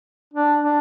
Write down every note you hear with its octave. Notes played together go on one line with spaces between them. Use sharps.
D4
D4